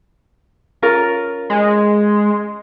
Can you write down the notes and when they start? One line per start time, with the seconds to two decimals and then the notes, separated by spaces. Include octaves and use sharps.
0.82 C#4 F4 A#4
1.50 G#3